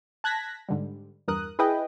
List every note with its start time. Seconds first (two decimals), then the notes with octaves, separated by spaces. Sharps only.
0.24 A5 F#6 G#6 A#6 B6
0.69 G#2 D3 G3
1.28 E2 G2 A#4 D#6 F#6
1.59 E4 G#4 B4 D#5 G5